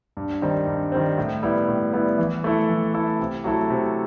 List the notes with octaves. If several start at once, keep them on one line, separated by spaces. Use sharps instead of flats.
G2
D#3 G3 C4
G2
D#3 G3 C4
A2
G3 B3 E4
A2
G3 B3 E4
E3
A3 E4 A4
E3
A3 E4 A4
C3
F#3 A3 E4 A4
C3